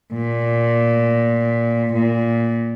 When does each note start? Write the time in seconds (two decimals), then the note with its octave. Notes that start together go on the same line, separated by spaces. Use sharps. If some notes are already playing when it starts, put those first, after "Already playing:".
0.14 A#2
1.94 A#2